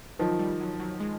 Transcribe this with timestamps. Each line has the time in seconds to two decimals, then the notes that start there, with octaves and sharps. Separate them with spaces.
0.19 D#3 F3 F#3
0.39 G3
0.60 F#3
0.80 F#3
1.00 G#3